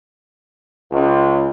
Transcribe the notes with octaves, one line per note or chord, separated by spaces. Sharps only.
C#2